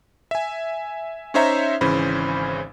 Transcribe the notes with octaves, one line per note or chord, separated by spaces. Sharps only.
E5 G#5
C#4 D#4 C5 C#5 E5 A#5
G#1 C#3 E3 C#4 C5 B5